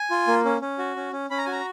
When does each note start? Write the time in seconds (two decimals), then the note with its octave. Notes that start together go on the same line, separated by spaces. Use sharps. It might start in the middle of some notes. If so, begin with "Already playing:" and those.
Already playing: G#5
0.11 F4
0.27 A#3
0.45 C#4
0.62 C#4
0.78 F#4
0.96 C#4
1.13 C#4
1.30 C#4 B5
1.38 A#5
1.45 F#4 G#5
1.52 A#5